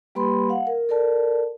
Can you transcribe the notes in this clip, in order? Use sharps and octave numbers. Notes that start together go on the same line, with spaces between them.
G3 A#3 G4 B4 B5 C6
F5 F#5
A#4
A4 A#4 D5 A5